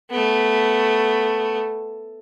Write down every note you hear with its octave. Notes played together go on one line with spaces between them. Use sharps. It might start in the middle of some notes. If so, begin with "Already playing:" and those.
A3 B3